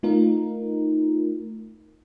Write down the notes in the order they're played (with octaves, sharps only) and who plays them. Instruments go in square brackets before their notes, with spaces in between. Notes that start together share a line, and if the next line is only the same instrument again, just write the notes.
[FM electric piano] A3 D#4 F4 A#4